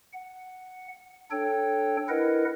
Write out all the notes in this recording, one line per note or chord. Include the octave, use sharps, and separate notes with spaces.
F#5
D4 A4 C#5 G5
E4 A#4 B4 D#5 F#5